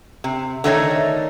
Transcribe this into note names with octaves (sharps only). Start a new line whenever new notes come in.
C3
D3 D#3 A3 D#4 G#4 C#5